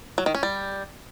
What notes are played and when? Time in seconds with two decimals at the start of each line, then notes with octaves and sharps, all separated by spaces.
0.18 F#3
0.26 D#3
0.35 C#4
0.43 G3